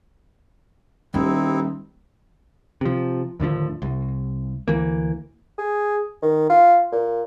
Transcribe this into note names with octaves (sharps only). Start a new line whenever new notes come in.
D#1 G3 C4 D#4 E4
C3 F3
D#2 A2 D3 F3
C2
D2 E3 A#3
G#4
D#3
F4
A#2